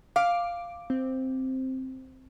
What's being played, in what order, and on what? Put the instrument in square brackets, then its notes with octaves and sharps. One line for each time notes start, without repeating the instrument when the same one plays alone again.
[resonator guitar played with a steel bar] F5 [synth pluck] D6
[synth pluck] C4